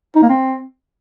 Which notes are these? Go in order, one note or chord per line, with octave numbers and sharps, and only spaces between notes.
D#4
A#3
C4